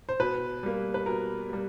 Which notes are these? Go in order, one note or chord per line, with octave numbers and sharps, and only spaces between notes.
C5
B2 B4
G3 A#3
B4
B2 A#4
G3 A#3